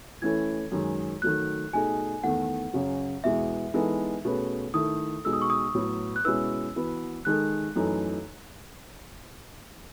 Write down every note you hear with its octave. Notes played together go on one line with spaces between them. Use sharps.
E3 A3 C#4 E4 G#6
F#2 D#3 G#3
D#3 F#3 A3 F#6
B2 A3 D#4 G#4 G#5
E2 D#3 A3 F#5
F#2 C#3 F#3 C#4
E2 B2 G#3 B3 E4 E5
E3 G#3 B3 D#4 A4
B2 A3 C#4 G#4 B4
D#3 A3 E4 A4 D#6
B2 G#3 D#4 A4 E6
D#6
C#6
D#6
A2 F#3 B3
F#6
B2 G#3 C#4 E4 B4 E6
E3 B3 F#4 B4
D#3 G#3 D#4 A4 F#6
F#2 E3 A3 D#4